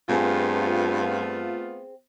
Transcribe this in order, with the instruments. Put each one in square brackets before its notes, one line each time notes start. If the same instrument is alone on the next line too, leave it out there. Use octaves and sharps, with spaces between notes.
[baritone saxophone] G2 [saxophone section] A3 B3 F4 [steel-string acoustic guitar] C4 G#4